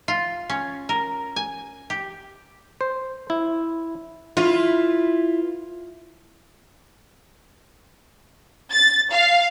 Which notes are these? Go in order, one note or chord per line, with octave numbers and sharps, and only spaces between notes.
F4
C#4
A#4
G#5
G4
C5
E4
E4 F4 B4
A6
F5